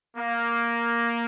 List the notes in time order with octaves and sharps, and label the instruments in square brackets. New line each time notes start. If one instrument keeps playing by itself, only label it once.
[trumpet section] A#3